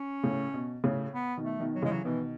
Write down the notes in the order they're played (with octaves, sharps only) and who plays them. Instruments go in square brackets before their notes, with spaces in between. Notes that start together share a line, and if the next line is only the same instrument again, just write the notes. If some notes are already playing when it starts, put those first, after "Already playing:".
Already playing: [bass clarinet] C#4
[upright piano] A2 C#3
B2
A2 C#3
[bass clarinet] B3
[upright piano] B2 D#3
[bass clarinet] A3
[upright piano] B2 D#3
[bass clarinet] F#3
[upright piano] C#3 E3 [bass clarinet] G#3
[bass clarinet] F#3
[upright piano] B2 D#3 [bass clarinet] E3